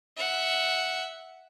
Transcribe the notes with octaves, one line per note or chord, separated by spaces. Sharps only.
E5 F#5